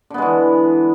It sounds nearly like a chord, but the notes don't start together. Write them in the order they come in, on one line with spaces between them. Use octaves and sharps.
D3 B3 G#3 E3